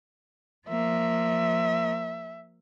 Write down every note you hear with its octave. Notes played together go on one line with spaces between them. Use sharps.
F3 A#3 E5